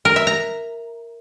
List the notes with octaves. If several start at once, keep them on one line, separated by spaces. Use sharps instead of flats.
A#4
E5
A#5